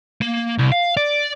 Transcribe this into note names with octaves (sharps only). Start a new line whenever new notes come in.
A#3
C2
F5
D5